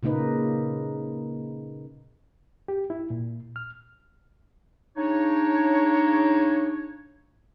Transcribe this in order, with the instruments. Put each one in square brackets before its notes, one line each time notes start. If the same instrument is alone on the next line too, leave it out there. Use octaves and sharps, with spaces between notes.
[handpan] A#2 C#3 A#3 D#4 B4
[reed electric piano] G4
E4
A#2
F6
[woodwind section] C#3 D4 D#4 C#5